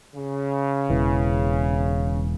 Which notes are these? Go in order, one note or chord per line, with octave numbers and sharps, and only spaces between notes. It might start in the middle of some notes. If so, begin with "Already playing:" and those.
C#3
E1 E3